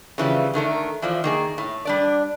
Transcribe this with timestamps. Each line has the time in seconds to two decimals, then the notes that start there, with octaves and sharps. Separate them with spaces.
0.18 C#3 E3 F3 G3
0.54 D3 D#3 A3 A#4
1.02 E3 F3 D5
1.24 D#3 A#3 G#4
1.58 A2
1.85 G3 D4 D5